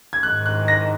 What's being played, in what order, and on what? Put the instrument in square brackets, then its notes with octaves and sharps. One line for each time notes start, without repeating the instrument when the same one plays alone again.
[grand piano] G#6
[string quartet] G#2 D#3 G#3 [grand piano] F#6
[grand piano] F#6
A#6